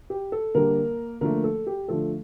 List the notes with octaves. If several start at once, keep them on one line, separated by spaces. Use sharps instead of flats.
G4
A4
D3 G3 A#3 A#4
D3 F3 A3 A#3 A#4
A4
G4
D3 F3 A3 A4